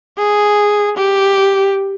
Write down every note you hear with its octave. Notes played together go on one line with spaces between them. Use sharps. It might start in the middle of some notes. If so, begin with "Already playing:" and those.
G#4
G4